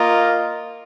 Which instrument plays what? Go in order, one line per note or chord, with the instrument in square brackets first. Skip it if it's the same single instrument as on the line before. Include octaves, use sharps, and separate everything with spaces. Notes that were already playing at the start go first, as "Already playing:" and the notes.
Already playing: [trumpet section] A#3 F4 A#4 D#5